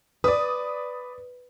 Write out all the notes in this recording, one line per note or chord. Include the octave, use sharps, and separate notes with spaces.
B4 D5 D#6